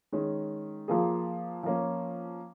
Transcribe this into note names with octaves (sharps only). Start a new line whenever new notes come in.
D#3 G#3 C#4
F3 A#3 F4 G#4
F3 A#3 C#4